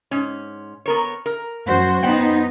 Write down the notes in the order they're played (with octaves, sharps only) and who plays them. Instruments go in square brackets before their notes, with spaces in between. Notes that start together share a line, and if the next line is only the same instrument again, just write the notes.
[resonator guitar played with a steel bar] G#2 C#4
B3 A#4 C#5
A#4
[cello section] F#2 F#4 C5
[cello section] B3 D#4 [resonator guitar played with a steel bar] C5 F#5 G5